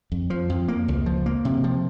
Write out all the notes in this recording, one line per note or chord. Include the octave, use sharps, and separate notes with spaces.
F2
F3
F2
A#3
C#2
F3
A#3
C3
F3